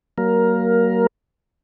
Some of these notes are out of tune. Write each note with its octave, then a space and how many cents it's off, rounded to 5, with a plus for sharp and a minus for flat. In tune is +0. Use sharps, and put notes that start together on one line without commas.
F#3 +35 A#3 +0 A#4 +10